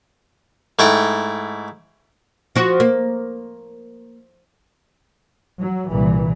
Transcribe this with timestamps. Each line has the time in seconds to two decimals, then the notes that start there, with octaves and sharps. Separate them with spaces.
0.79 G#2 A3 E4 G5
2.56 F3 F#4
2.80 A#3
5.61 F#3
5.90 C2 A#2 E3